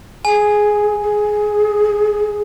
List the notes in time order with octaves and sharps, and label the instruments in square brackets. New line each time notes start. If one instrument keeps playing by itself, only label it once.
[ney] G#4 [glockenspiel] G#5
[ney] G#4